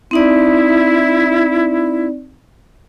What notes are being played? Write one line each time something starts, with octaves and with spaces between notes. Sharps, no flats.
C4 D#4 E4 D5